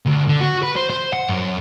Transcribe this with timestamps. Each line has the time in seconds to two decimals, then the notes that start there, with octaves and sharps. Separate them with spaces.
0.06 D2
0.29 D3
0.41 F#4
0.63 B4
0.76 C5
0.90 C5
1.13 F#5
1.29 F#2